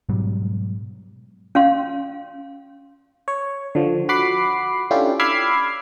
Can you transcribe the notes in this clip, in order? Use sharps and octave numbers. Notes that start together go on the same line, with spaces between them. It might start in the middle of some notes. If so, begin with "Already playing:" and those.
G#2 B2 F#3 G3
C#4 F5 C6
C#5
D3 F3
F#4 F#5 B5 D6 C7
C#4 D4 E4 F4 G4 A4
B5 D6 E6 F6 G#6 C7